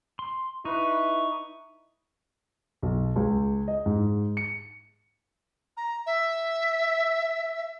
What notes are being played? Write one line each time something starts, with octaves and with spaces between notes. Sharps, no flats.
C6
D#4 E4 B4 C#6
B1
C#2
D#5
G#2
C#7
A#5
E5